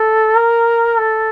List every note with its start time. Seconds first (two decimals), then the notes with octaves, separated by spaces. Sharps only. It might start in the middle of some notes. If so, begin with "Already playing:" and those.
Already playing: A4
0.37 A#4
0.99 A4